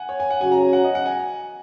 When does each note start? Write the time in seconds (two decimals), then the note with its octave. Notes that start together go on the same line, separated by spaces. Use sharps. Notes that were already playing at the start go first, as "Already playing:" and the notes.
Already playing: F#5 G#5
0.09 C#5
0.20 G#5
0.30 F#5
0.40 C#3 F#3 C#4 F#4 G#5
0.52 A#5
0.63 G#5
0.73 F#5
0.84 D#5
0.95 F#5
1.06 G#5